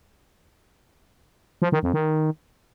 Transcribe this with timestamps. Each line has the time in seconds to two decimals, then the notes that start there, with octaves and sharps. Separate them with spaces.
1.62 F3
1.72 D#3
1.83 F2
1.93 D#3